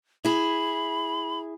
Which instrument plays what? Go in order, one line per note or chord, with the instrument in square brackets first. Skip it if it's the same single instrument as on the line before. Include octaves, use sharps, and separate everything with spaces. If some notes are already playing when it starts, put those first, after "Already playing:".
[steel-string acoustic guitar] E4 G#4 [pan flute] B5